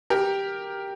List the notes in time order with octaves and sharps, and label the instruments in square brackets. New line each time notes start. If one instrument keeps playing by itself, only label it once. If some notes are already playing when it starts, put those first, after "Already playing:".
[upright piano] G4 A#4